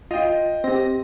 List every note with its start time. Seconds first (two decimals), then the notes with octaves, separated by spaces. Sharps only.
0.11 F4 D#5 G5
0.64 C4 G4 A#6